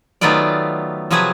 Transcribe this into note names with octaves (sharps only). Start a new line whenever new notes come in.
D#3 F#3 A3 B3 F4 D5
C3 F3 F#3 G#4 B4 F#5